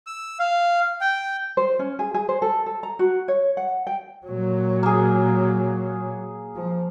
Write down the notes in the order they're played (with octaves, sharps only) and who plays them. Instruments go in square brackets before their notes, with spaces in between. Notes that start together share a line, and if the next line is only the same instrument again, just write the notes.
[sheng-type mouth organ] E6
F5
G5
[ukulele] C5
C#4
G#4
G#4
C5
A4
A4
A#5
F#4
C#5
F#5
G5
[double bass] A#2 F#3
[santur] A#3 G#4
[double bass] F3